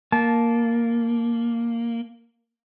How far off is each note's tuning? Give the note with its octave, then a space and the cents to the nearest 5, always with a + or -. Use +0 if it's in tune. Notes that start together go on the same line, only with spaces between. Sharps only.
A#3 +0 A5 -15